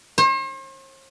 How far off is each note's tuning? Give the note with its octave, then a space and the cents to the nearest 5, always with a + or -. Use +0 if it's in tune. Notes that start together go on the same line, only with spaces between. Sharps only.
C5 +45